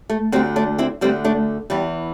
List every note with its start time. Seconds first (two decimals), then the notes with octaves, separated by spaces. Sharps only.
0.10 A3
0.32 D2 G3 C4
0.36 D3
0.56 A3 D4
0.78 C4 E4
1.01 D2 D3 G3 C4
1.24 A3 D4
1.70 E2 E3 G3